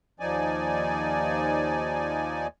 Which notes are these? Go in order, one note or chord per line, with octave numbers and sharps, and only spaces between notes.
D#2 F3 D#4 D5 G#5